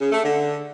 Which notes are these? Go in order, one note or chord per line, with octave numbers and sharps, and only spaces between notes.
C#3
A3
D3